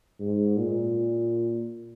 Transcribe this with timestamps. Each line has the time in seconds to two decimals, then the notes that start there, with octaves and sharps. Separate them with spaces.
0.20 G#2
0.57 A#2